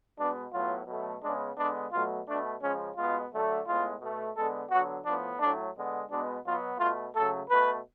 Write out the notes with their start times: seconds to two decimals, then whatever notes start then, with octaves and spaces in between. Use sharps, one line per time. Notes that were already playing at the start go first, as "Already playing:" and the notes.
0.18 B2 G#3 B3 D4
0.53 A2 F#3 B3 F4
0.87 B2 F#3 A3
1.22 C#3 G#3 B3 D4
1.57 D3 G#3 B3 D4
1.92 B2 F#3 A3 F4
2.27 B2 A3 D4
2.61 C#3 F3 G#3 C#4
2.97 B2 G#3 B3 F4
3.32 D3 F#3 A3
3.66 A2 G#3 B3 F4
4.01 B2 A3
4.35 D3 G#3 B3 A4
4.71 D3 F#3 B3 F#4
5.05 A2 F3 B3 D4
5.40 A2 F#3 A3 D4
5.75 D3 G#3 B3
6.10 B2 G#3 B3 D4
6.45 B2 F#3 B3 F4
6.79 B2 A3 F4
7.14 C#3 F#3 A3 A4
7.49 B2 A3 B4